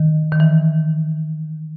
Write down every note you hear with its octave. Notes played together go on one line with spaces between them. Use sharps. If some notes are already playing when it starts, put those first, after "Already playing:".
Already playing: D#3
D#3
E3